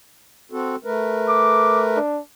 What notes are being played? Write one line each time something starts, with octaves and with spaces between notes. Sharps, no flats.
C4 F#4 A4
A3 A#4 B4
D6
D4